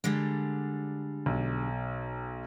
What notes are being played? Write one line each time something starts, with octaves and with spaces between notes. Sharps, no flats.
D3 G3 G#3
B1